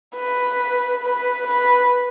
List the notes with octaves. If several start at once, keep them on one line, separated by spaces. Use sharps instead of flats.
B4
B4
B4